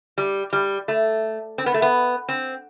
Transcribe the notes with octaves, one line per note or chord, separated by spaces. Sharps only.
G3
G3
A3
C4
B3
A3
B3
C4